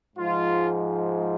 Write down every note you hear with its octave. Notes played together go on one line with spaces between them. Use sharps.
G#2 F3 G#3 F4